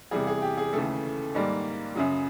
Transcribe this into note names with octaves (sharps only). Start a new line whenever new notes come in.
E2 C3 E3 G3 G#4
G#4
G4
G#4
D#2 C#3 E3 A3 A4
G#2 D#3 G3 A#3
F#2 C#3 F#3